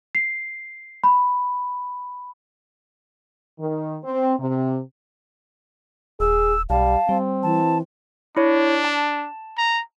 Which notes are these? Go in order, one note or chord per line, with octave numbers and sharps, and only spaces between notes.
C7
B5
D#3
C4
C3
D#1 G#4 E6
B1 G3 F5 A5
G3 C4
E3 A5
D4 E4 C#5
A5
A#5